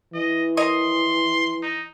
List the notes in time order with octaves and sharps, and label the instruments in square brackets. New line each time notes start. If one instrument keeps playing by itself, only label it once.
[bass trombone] E3 [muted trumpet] D#5
[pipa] A#4 C#5 D#5 [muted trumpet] C6
[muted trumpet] D#4